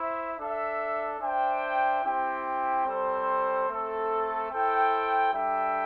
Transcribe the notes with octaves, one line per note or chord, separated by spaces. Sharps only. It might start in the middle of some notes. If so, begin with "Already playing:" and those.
Already playing: E4 C5 E5
D4 A4 E5
D4 C5 E5 G5
C4 E4 G4 C5 G5
G3 C4 A4 C5
A3 C4 A4
E4 A4 C5 G5
G3 D4 A4 E5 G5